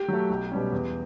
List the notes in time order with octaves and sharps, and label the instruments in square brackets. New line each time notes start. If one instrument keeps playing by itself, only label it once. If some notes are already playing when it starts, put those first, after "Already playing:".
Already playing: [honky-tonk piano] G4
[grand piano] F#3 A3
B1
B2 G3 C#4
E2